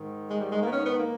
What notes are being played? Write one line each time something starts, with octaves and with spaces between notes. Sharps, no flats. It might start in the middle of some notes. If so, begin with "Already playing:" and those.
Already playing: G#2 D#3
G#3
G3
G#3
A#3
B3
C#4
B3
A#3